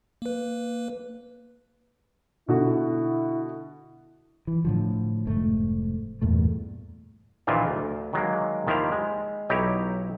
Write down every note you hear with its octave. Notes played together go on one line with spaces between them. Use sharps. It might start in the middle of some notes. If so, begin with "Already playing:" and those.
A#3 B4
B2 D3 E4 F#4
E3
A2 D3 F3
F1 G#2 A3
E2 G2 A#2 A3
A#1 A#2 D#3 E3 A#3 F4
D2
D#3 F#3 G#3 A#3
D#2 D#3 F3 E4 G4 F5
G#3
B1 D#4 E4 G4 C#5 A#5